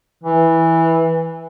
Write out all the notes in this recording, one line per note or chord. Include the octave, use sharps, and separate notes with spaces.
E3